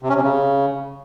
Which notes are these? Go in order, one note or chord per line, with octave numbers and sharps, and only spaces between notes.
C3
C#4
C3
C#3